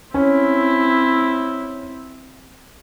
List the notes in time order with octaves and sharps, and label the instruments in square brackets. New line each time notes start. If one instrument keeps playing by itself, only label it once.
[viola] C4 E4 [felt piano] C#4